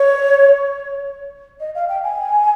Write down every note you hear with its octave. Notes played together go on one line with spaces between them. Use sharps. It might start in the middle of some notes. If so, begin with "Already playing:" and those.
Already playing: C#5
D#5
F5
G5
G#5